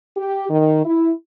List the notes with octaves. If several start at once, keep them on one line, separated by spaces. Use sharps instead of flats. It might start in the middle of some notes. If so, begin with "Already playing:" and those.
G4
D#3
E4